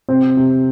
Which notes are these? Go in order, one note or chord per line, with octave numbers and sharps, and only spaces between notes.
C3 C4
C3